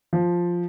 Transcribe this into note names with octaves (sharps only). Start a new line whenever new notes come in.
F3